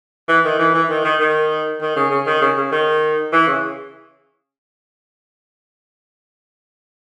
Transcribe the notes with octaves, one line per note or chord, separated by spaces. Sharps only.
E3
D#3
E3
E3
D#3
D#3
D#3
D#3
C#3
C#3
D#3
C#3
C#3
D#3
E3
C#3